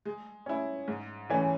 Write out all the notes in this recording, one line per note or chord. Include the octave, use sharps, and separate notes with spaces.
G#3
C#4 E4
G#2
E3 A3 C#4